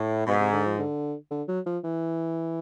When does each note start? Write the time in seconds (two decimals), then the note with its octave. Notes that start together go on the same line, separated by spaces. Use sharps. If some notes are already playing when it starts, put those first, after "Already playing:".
Already playing: A2
0.26 G#2 B2
0.39 C3
0.52 D3
0.65 F3
0.78 D3
1.31 D3
1.48 F#3
1.66 F3
1.84 E3